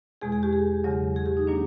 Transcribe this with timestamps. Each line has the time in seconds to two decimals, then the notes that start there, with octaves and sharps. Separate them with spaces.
0.21 E2 B2 G#3 G#4
0.32 G#4
0.43 G4
0.53 G#4
0.84 E2 C#3 F#3
1.16 G#4
1.26 G4
1.37 D#4
1.47 D#3 F#3 A#3 D4